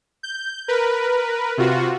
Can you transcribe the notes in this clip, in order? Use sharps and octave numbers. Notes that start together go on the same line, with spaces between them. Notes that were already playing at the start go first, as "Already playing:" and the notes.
G6
A#4 B4
C3 F4 F#4